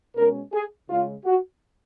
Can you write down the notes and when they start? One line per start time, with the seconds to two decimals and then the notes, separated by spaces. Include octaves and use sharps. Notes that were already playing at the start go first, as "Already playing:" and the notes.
0.16 B2 G#3 C#4 A#4
0.52 G#4
0.90 C#3 G#3 C#4 F4
1.25 F#4